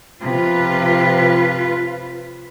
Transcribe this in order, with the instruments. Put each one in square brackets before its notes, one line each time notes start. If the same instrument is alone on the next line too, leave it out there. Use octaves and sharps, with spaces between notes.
[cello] C3 F3 [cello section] F4 B4